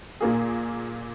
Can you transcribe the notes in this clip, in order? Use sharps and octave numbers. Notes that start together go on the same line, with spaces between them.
A#2 A#3 G#4